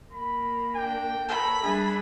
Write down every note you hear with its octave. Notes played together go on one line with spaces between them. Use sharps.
A#3 B5
D4 G5
A4 B4 C#5 A#5 B5
G3 D4 G#4 E5